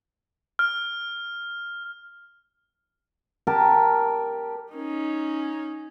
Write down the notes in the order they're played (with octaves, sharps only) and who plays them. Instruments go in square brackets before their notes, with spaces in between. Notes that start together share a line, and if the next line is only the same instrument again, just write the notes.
[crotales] F6
[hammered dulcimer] G4 A#4 G5 A5
[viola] C#4 D#4